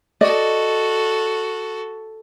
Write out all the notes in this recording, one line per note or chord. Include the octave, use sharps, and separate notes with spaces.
F#4 A4 D5 D#5